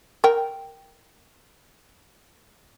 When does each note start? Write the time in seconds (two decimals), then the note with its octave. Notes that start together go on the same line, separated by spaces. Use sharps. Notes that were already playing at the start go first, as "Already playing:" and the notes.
0.24 A#4 G5